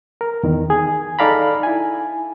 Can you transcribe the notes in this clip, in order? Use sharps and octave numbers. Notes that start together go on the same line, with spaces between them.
A#4
E2 D#3
G#4
D#4 A4 D5 F5 A#5 B5
E4 G#5